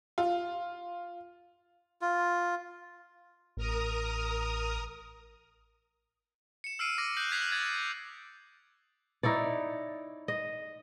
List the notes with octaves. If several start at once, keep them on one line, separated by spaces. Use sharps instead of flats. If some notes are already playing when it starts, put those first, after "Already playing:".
F4
F4
A1 A#4 A#5 D#6
C#7 E7
E6 F6 C7 D7 D#7
D6 A#6 D7
D#6 F#6 G6 A#6 C#7 F#7
F#6 G#6 B6 C7 F7
F6 G#6 A6
D#4 E4 C#5 D5
D#5